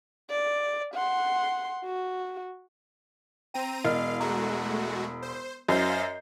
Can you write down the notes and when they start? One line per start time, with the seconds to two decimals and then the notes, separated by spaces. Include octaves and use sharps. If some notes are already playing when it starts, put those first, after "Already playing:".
0.30 D5
0.94 F#5 C6
1.85 F#4
3.54 C4 G5 A#5 D#7
3.85 E1 A#4 D#5 F5 F6
4.20 G#3 A3 F#4 A#5
5.22 C5
5.69 F#2 C5 D#5 F5 G6 A#6 C7